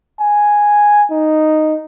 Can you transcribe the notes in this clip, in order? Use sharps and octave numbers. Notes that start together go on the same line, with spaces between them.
G#5
D#4